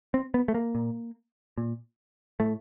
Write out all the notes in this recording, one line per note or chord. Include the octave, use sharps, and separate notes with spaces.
C4
B3
A3
A#3
A#2
A#2
A2 A3